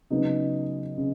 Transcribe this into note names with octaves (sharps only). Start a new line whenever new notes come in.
C#3 F#3 B3 D#4
C#3